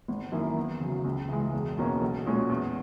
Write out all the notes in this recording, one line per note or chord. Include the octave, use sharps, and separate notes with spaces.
G#1
F#2 D#3 A#3 E4
E2
C#3 F#3
C#2
C#3 E3 G#3
E1
E2 B2 A#3 C#4
B1
A#2 G#3 C#4 F#4
E2